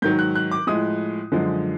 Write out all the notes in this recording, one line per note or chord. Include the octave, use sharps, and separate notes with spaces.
G#2 D#3 F#3 G6
F#6
F#6
D6
A2 F3 G#3 D#6
F#2 D3 F3 G#3